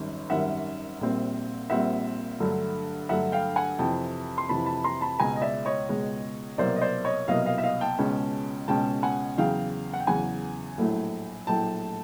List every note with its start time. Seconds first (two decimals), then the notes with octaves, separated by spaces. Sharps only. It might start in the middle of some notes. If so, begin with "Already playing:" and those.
Already playing: G#1 F#2 D#3 G3
0.30 G#1 F#2 D#3 G3 E5 F#5
1.01 A#1 A#2 G3 C4
1.70 A#1 A#2 G3 C4 E5 F#5
2.40 G2 D3 F#3 A3
3.09 G2 D3 F#3 A3 E5 F#5
3.32 F5 G5
3.56 F#5 G#5
3.79 F2 C3 E3 G5 A5
4.38 C6
4.49 F2 C3 E3 A5 B5
4.66 A5 B5
4.84 A#5 C6
5.01 A5 B5
5.19 C#2 B2 G#3 G#5 A#5
5.36 D#5
5.42 D5 E5
5.65 C#5 D#5
5.89 C#2 B2 G#3
6.58 C2 B2 F#3 A#3 C5 D5
6.76 D#5
6.81 C5 D5
7.05 C#5 D#5
7.28 C2 B2 F#3 A#3 D#5 F5
7.46 D#5 F5
7.58 E5
7.63 D#5 F5
7.81 G5 A5
7.99 C#2 B2 G#3 C#4
8.68 C#2 B2 G#3 C#4 G5 A5
9.03 F#5 G#5
9.38 E2 C#3 F#3 F5 G5
9.94 F#5
10.00 G5
10.07 E2 C#3 F#3 F#5 G#5
10.77 A#1 A2 F#3 A3
11.47 A#1 A2 F#3 A3 G5 A5